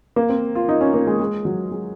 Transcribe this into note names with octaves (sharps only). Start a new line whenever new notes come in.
A#3
C4
F4
D#4
C#4
A#3
G#3
G#3
F#3
G#3